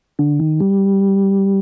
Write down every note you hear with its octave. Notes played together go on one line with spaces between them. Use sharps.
D3
D#3
G3